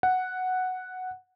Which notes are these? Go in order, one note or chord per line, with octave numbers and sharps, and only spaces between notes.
F#5